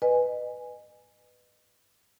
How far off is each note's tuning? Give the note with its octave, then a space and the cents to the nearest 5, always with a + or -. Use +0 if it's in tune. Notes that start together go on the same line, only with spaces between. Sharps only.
B4 +0 D#5 -30 G#5 +0